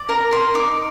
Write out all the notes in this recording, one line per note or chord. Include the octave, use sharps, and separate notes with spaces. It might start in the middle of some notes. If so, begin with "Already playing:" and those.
Already playing: D5
A#4 A#5
A#4 C6
D#4 D6